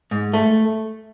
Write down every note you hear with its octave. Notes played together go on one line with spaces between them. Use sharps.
G#2
A3